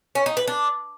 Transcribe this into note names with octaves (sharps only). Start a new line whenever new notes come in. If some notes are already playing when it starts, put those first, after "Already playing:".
C#4
D#4
B4
D4